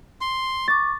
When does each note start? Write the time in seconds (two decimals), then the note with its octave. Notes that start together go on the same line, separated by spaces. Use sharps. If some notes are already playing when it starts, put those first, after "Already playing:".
0.21 C6
0.68 C#6 D6 A6